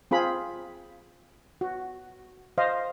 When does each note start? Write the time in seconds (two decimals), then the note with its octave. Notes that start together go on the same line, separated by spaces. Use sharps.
0.11 C4 F4 G#4 B5
1.61 F#4
2.58 C5 D#5 F5